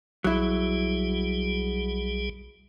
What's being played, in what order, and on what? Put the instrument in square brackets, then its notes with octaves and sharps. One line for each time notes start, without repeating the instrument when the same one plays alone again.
[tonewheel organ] B1 G3 G#4 [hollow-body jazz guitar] F#3 E4